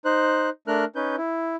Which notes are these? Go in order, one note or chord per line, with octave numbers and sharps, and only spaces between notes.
D#4 C5 F#6
A3 D4 A#4 F6 F#6
C#4 D#4 B4 G6
E4